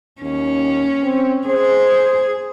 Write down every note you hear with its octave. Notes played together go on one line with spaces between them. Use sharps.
D#2 C#4
C4
G#4 C5